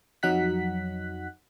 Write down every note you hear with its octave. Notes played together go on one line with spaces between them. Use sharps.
F2 F#3 D#4 F#5 F#6 B6